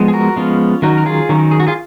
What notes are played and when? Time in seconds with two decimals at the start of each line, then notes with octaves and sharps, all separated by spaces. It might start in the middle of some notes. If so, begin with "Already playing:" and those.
Already playing: F3 G#3 B3
0.08 G#4
0.13 F#4 A#4
0.36 F3 G#3 B3 C#4 F4
0.82 D#3 F#3 C#4 D#4 F#4
0.98 A#4
1.06 F4 G#4
1.29 D#3 F#3 C#4
1.51 G#4
1.60 F#4
1.67 F4 G#4